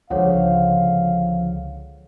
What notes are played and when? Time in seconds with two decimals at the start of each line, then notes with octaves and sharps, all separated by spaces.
0.10 C#2 D3 F3 G#4 C#5 F5 F#5